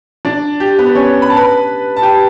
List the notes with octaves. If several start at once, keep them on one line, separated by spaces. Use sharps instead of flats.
D4 D5
G4
B3 B4
C#4 C#5
B5
A5
B4 B5
A5
G4 G5